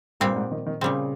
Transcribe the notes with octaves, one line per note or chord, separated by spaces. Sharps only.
G2 A#2 G3 C4
G#2
D#3
D#3
A#2 C#3 G3 C4